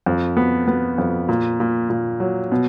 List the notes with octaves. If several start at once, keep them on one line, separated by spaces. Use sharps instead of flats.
F2
B3
B3
F2
A#2
A#2
A#2
F#3
B2